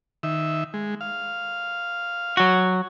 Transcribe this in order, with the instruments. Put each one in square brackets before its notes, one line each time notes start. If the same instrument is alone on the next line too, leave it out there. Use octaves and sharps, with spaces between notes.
[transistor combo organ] D#3 E5
G#3
F5
[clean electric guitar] F#3 F#4